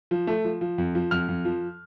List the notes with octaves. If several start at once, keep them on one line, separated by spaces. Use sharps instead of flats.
F3
A3
F3
F3
F2
F3
F2 F6
F2
F3